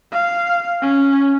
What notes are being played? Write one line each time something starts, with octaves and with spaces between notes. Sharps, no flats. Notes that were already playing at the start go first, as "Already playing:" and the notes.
F5
C#4